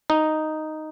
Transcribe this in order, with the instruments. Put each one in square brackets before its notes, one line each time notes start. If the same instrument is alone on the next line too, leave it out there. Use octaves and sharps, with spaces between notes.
[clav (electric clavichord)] D#4